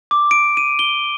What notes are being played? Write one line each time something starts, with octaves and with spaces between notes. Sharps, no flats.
D6
D7
D#7
G7